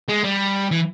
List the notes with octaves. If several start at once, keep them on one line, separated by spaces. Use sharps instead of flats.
G#3
G3
E3